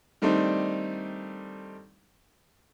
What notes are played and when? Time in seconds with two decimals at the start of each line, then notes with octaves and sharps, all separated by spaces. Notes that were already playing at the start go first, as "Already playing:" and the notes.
0.22 D#3 G3 A3 C4 D4 D#4